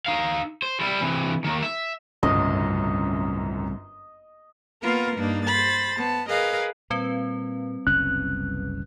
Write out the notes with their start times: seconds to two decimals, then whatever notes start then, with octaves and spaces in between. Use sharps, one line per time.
0.06 D#4 F5
0.62 C5
0.80 G3 E4
1.01 C3 E3
1.44 D#3 A#3
1.63 E5
2.23 G1 C2 F#2 A2 C#3 D#5
4.83 A#3 B3 F4 A#4 B4
5.16 G2 A#3 D4 D#4
5.46 C5 B5 A6
5.97 B3 A5
6.29 G#4 A#4 B4 D#5 F5
6.90 A#2 G3 C4 B4
7.87 F#1 C2 C#4 F#6